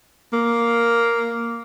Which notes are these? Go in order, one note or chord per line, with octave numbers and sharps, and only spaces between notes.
A#3